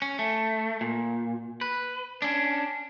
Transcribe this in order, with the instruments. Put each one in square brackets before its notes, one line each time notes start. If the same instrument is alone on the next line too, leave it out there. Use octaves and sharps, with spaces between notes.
[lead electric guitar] C#4
A3
A#2
B4
C#4 D4